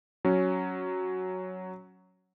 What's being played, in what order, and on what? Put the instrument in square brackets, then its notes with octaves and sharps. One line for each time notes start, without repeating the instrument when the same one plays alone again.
[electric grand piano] F#3 C#4